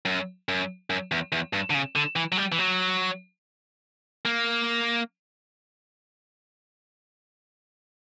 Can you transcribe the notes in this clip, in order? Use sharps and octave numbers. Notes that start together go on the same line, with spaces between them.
F#2
F#2
F#2
E2
E2
G2
D3
C#3
D3
E3
F#3
G3
E3
F#3
A#3